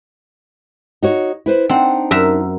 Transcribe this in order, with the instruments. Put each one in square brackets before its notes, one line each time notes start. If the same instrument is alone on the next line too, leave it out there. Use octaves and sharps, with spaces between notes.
[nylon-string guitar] D#4 F#4 C#5
E4 B4 C5
[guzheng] C4 [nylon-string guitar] D4 D#4 F#5
[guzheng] F#2 A#4 E5